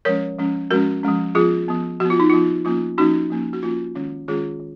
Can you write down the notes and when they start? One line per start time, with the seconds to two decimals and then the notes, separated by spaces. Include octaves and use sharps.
0.05 F3 G#3 C#4 A#4 C#5
0.38 F3 G#3 C#4
0.70 F3 G#3 C#4 F#4 A#4
1.03 F3 G#3 C#4
1.35 F3 B3 F4 G#4
1.68 F3 B3
2.00 F3 B3 F#4
2.10 F4
2.20 D#4
2.30 F3 B3 F4
2.65 F3 A#3 C#4 F4
2.98 F3 A#3 C#4 D#4 F#4
3.30 F3 A#3 C#4
3.53 F#4
3.63 F3 A#3 C#4 F4
3.95 D#3 G#3 C#4
4.28 D#3 G#3 C#4 F4 G#4
4.60 D#3